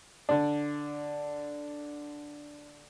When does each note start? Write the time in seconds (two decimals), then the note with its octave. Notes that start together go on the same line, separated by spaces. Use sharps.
0.29 D3 D4